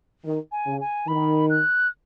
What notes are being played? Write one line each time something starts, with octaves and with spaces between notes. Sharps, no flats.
D#3
G#5
C#3
G#5
D#3 B5
F#6